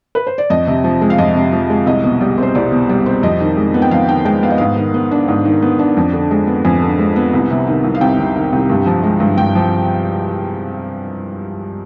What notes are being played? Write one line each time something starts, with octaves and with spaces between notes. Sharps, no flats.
B4
C5
D5
F2 D#5
C3
F3
G#3
F5
F2 D#5
C3
F3
G#3
C2 D#5
B2
G3
C4
C5
C2 D5
B2
G3
C4
F2 D#5
D#3
G#3
B3
G5
F2 F5
D#3 G5
G#3 G5
B3 F5
D#5
G#2 F5
D#3
B3
D4
G#2
D#3
B3
D4
F2
D3
G#3
B3
F2 G#5
D3
G#3
B3
C2
C3
D#3
C2
F5
C2 G5
C3
D#3
C2
G2
F3
G#3
G2
G2 G5
F3